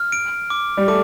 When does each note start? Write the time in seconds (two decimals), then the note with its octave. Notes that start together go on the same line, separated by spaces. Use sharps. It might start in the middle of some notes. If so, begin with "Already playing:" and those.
Already playing: F6
0.12 D7
0.50 D6
0.77 G3
0.88 A3 D6